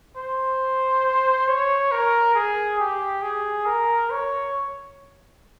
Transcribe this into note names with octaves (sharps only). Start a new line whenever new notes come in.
C5
C#5
A#4
G#4
G4
G#4
A#4
C#5